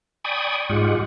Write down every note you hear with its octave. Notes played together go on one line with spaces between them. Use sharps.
D5 G5 G#5 B5 C#6 D#6
G#2 G#3 F4 G4 F#5